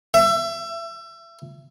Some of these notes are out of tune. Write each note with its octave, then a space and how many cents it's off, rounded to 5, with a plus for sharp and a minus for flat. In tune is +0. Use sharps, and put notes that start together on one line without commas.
E5 +30